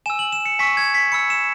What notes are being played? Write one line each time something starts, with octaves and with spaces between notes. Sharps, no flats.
G#5 E6 E7
F#7
E7
C#7
G#5 C#6 E6 B6
G#6
B6
B5 E6 C#7
E7